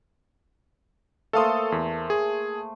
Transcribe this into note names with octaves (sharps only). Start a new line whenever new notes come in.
A3 A#3 A4 C5 F5 D#6
E2
G#4